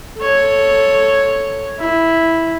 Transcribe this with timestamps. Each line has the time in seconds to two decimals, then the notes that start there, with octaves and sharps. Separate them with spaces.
0.18 A4 C#5
1.79 E4